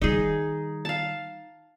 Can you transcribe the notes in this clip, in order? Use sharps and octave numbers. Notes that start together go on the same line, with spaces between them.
D#3 G3 D#4 G#4
F5 A5